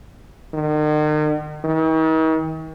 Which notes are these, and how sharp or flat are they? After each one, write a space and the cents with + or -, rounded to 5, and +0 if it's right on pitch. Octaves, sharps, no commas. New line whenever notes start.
D#3 -40
D#3 +45